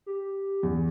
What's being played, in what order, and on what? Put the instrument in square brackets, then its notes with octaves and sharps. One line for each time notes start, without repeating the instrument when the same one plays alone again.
[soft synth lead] G4
[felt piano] E2